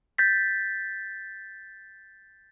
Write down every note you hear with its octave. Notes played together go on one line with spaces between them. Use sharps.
G6 A6 B6